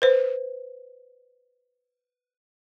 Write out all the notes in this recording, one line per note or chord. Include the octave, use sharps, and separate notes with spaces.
B4 C5